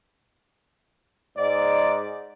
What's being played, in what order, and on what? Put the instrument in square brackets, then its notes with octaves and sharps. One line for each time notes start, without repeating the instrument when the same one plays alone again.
[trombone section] G#2 [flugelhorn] D5